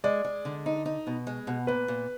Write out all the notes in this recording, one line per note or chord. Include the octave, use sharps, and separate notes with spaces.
G#3 D5
G#3
D3
D#4
D#4
B2
G#3
B2
A#2 B4
A#2